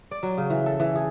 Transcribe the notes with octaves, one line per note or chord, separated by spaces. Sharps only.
D5
F#3
C#3
E3
A4
E3
G#4